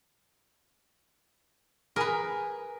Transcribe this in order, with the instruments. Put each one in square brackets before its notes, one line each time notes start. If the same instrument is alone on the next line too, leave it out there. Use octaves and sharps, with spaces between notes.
[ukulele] G#4 G#5 A#5 [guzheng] A#4 B4